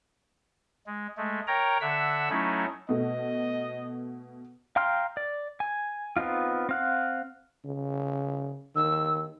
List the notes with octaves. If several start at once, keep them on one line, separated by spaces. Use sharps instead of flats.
G#3
G#3 A3
A#4 C#5 G5 A#5
D3 E5 F#5 E6
F#3 A3 C#4 D#4 E4
B2 A3 D#5
F5 G5 A#5 C6 F6
D5
G#5
B3 C4 D#4 F4
C4 F5 F#5
C#3
D#3 E6